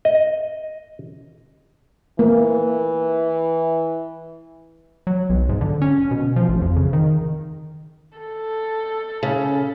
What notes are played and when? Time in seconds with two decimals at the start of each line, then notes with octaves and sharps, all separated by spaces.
0.05 D#5
2.19 E3 A#3
5.07 F#3
5.30 B1
5.49 G#2
5.61 D3
5.82 C#4
6.11 B2
6.36 F3
6.49 A1
6.62 F2
6.76 C#3
6.93 D#3
8.18 A4
9.23 C#3